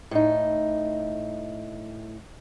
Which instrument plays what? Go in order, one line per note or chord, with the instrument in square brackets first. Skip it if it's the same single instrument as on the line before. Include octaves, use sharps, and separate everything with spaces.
[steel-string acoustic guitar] A2 D#4